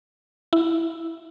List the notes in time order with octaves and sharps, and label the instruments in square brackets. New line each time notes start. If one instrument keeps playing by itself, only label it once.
[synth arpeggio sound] E4